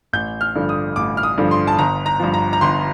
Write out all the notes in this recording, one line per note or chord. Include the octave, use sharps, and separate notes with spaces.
A1 G6
F6
G2 D3 F3
D#6
A1 D6
F6
D#6
G2 D3 F3
C6
A5
G1 A#5
A#5
G2 F3
A#5
A#5
G1 C6